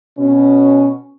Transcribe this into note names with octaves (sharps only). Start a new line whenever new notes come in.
B2 C#4